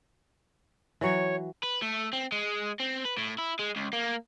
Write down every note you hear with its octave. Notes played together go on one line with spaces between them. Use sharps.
E3 F#3 C#5
B4
A3
C4
G#3
C4
B4
A2
E4
G#3
C#2
A#3